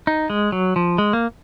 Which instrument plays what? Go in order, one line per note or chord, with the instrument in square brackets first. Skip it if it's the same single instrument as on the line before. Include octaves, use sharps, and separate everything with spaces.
[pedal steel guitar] D#4
G#3
F#3
F3
G#3
A#3